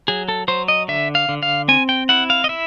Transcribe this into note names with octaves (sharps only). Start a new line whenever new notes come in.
F#3 G#4
A4
F#3 C5
D#5
D3 E5
F5
D3
F5
C4 G#5
G5
E4 F#5
F5
D#5
E4 E5